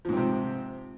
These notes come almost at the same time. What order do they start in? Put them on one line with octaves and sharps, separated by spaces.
F3 G#2 C4 C3